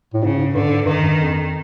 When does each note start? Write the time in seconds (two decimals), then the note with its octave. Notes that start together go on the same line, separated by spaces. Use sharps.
0.14 A2
0.23 G#2 C#3
0.39 G#2
0.54 G2 D3
0.71 G#2
0.86 G2 D#3
1.03 F#2
1.18 F2